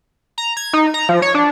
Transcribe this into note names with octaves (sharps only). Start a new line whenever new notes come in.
A#5
G#6
D#4
A#5
F3
C#5
D4